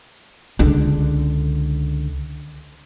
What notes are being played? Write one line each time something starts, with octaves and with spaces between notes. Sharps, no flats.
C#2 D3